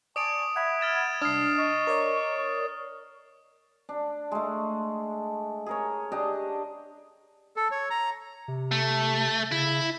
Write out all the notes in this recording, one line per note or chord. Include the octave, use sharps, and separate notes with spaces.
D5 G#5 A5 C#6 D#6 D7 F7
E5 F#5 B5 G#6
F6 A6 E7
C3 G3 G#3 D4 D#6 F6 C7
D#5 C#6
A#4 C#5 D5
D4
G#3 A3
G#4 A#4 C#5
D4 G4 D#5
A4
C#5
A#5
C3
A3
C#3 E4